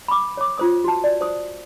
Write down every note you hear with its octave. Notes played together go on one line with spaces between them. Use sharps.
B5 D6
C#5 D6
F4 C5 D#6
F#4 A5
D5
C5 D#6